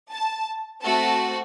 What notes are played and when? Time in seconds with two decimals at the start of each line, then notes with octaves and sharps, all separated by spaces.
0.11 A5
0.82 A3 C4 F#4 A4 A5